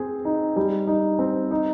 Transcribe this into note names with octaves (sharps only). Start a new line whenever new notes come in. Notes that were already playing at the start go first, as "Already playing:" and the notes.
Already playing: C4 G#4
D#4
G3
D#4
C4
D#4